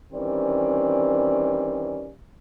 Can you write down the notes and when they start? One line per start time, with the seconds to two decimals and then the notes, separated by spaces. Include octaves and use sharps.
0.13 D#3 E3 G3 C4 C#4 D5